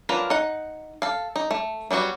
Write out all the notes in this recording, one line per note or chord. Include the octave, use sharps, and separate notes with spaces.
F#3 D4 F4 A#4 B4
D#4 F#5
A4 F5
D#4
A3
F#3 G3 B3 F#4